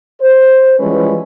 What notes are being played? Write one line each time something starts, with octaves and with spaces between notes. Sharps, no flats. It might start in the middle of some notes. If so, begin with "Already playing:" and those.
C5
E3 F3 G3 G#3 C#4 B4